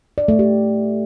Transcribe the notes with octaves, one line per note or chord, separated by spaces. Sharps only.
D5
A3
G4